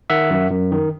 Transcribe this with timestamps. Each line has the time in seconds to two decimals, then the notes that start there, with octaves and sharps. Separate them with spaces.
0.10 D#3 E5 F#5
0.30 F#2
0.51 F#2
0.72 D#3